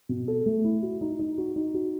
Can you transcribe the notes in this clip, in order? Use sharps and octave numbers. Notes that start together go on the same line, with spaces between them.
B2
A4
A3
E4
F#4
D#4
D#4
F#4
D#4
F#4